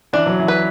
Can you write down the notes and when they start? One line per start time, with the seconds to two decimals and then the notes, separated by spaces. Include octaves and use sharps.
0.13 E3 D4
0.26 F#3
0.40 E3
0.48 B4